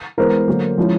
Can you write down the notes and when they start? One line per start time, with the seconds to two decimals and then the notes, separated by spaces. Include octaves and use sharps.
0.18 E3 G#3 B3 A#4 C5
0.47 D3 F#3 A#3
0.78 F3 G#3 C#4 E4